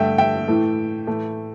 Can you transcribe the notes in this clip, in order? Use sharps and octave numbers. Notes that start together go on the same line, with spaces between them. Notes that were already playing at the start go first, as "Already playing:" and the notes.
Already playing: G2 D3 A3 E5 G5
E5 G5
A2 E3 A3
A2 E3 A3